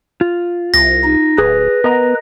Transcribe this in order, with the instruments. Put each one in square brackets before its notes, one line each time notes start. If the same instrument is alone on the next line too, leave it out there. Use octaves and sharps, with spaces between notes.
[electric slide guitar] F4
[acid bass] C2 [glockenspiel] A#6
[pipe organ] D#4
[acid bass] D1 [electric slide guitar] G#4 [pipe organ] B4
[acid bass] B3 [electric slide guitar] A#4 D#5 A#5